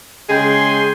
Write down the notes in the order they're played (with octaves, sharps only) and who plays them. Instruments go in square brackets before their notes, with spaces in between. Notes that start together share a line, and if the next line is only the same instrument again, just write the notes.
[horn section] C#3 G#3 G#4 G5 C6